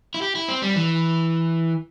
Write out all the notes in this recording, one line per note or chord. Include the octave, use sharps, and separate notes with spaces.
E4
G4
E4
C4
G3
E3